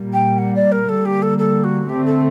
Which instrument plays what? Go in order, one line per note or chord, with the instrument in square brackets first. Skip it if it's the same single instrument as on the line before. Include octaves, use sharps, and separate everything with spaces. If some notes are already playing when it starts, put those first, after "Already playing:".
Already playing: [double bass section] A#2 G3 A#3
[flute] G5
F#5
D5
A#4
[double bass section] D3 G3 A#3 [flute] A4
[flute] G4
A4
A4
F#4
[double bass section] D3 A3 C4 [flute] G4
[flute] A4